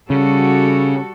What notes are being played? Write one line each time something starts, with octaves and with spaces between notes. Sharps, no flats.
C#3 G3 F#4 A4